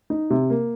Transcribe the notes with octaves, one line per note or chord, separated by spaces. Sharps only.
D#4
C3
A#3